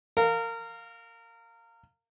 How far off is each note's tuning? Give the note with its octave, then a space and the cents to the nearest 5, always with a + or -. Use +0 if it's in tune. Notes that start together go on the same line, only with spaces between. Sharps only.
A#4 -25 F5 +10